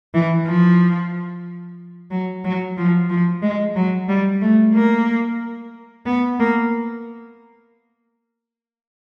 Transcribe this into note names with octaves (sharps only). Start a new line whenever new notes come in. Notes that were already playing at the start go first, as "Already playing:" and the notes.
E3
F3
F#3
F#3
F3
F3
G#3
F#3
G3
A3
A#3
B3
A#3